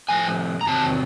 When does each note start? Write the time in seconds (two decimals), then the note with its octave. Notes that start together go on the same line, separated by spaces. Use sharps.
0.09 A2 F3 A3 G#5
0.61 A#5
0.67 E2 C3 D#3 F#3 A5